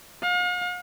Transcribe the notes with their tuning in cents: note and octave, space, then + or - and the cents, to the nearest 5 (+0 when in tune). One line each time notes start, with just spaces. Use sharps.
F5 +45